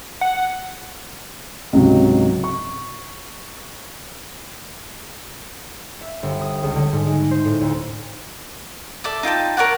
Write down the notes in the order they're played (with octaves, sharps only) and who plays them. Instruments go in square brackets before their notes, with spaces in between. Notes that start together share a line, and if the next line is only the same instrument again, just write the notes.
[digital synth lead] F#5
[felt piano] C#2 G#2 C3 F#3
C#6
[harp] E5
G1
D#6
C#2
D3
G#2
G#3
C5
A2
D2
[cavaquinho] A4 D5 E5
D#4 F4 G5 A5
A#4 C#5 D5 F#5